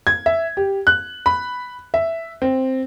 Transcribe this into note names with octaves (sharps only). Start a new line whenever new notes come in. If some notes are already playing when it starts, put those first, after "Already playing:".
G#6
E5
G4
F#6
B5
E5
C4